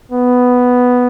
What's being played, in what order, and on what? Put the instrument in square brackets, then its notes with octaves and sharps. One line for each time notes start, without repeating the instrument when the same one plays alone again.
[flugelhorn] B3